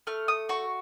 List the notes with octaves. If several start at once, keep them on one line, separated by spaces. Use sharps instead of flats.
A3 F6
D#6
F#4 C#6